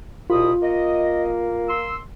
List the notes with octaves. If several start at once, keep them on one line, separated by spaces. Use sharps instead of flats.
C2 B2 F4 B5 D#6
A#3 D#5
C6 E6